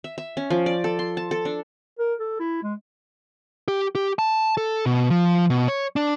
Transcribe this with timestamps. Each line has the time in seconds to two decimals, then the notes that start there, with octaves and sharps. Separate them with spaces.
0.04 E5
0.18 E5
0.37 C#4
0.50 F3
0.66 D5
0.84 A4
0.99 C6
1.17 A5
1.31 A4
1.45 D4
1.99 A#4
2.20 A4
2.40 E4
2.63 G#3
3.68 G4
3.95 G4
4.19 A5
4.57 A4
4.86 B2
5.10 F3
5.50 B2
5.68 C#5
5.96 D4